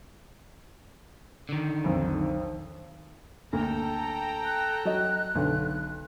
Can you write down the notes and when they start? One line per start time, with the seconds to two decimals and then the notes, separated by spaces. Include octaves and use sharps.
1.49 D3 D#3
1.84 B1 F2
3.53 D2 A#3 A4 G5 A#5
4.45 F#6
4.85 F#3 D#5
5.35 B1 D3